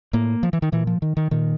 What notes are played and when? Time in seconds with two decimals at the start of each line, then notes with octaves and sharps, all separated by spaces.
0.13 A2 A#3
0.43 F3
0.53 E3
0.62 D#3
0.72 A#2 E3
0.87 F3
1.02 D#3
1.17 D#3
1.31 A#2 D#3